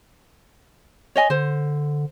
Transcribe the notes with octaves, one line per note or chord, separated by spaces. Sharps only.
C#5 D#5 G#5
D3 C5